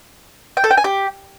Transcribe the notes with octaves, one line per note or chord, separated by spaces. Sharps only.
G5
A4
G5
G#5
G4